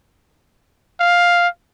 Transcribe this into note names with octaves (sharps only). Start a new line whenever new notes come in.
F5